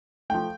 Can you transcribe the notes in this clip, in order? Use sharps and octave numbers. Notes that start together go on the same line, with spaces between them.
F3 A3 G5